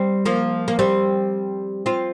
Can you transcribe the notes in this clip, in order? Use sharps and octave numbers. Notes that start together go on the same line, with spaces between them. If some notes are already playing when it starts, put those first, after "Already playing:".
Already playing: G3 C4
F3 A#3
A#3
G3 C4
C4 F4